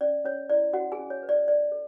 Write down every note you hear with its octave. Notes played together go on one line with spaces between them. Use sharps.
C#4 D5
C#4 C#5
E4 D5
C#4 F#4 F#5
G#4 G#5
C#4
C#5
B4
D5
C#5 D5
A4